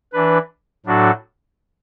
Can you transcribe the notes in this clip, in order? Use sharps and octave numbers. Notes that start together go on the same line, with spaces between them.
E3 D4 B4
A2 F#3 D4 F#4 A4